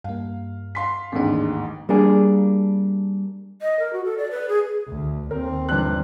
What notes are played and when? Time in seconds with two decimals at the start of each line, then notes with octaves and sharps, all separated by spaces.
0.04 G2 A#3 F5
0.75 F5 C6 B6
1.12 A1 D#2 G#2 C4 D4
1.89 G3 A#3 D4 G#4
3.62 D#5
3.80 A#4
3.93 F#4
4.05 A4
4.18 D5
4.31 B4
4.49 G#4
4.88 D2
5.31 D#2 C4 A#4
5.69 G1 D4 F#6